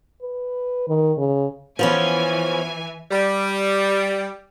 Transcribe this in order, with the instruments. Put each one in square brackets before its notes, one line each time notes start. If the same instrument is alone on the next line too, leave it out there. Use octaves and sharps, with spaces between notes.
[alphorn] B4
D#3
C#3
[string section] E3 G#5 [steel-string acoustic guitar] F3 B3 C#4
[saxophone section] G3